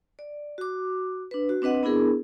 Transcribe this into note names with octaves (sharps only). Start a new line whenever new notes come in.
D5
F#4 D6
D4 B4
F#4
C4 D4 B4 D#5 F#5
B3 D4 E4 G#4 A#4